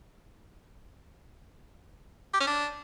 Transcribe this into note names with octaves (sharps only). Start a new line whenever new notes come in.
G4
C#4
D4